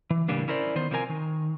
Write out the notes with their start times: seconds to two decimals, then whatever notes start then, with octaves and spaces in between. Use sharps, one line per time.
0.10 E3
0.28 A2 C#3 E3 G3 A#3 D4
0.48 C#4 E4 A#4 C5 D5
0.75 D#3 B3 C5
0.91 C3 F3 A#3 C4 A#4 G#5
1.09 D#3